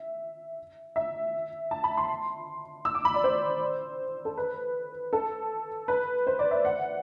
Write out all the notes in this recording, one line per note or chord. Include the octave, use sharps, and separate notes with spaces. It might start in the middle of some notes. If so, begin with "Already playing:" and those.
Already playing: E5
E5
A5
B5
C6
E6
D6
B5
D5
C5
A4
B4
A4
B4
C5
D5
E5
F#5